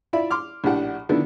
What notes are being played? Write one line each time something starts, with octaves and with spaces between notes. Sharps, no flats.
E4 F4 D5 E5 B5
C6 D6 F6
A#1 A2 D4 G4 F#5
D3 D#3 F3 B3 D4 E4